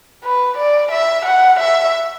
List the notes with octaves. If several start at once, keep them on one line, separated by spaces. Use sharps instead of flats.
B4
D5
E5
F#5
E5